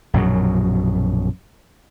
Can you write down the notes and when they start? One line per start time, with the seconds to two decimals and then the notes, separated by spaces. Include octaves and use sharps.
0.14 A#1 F#2 B2 F#3